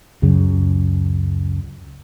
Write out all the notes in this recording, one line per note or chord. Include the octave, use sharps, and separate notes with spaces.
C#2 F#2 C#3 F#3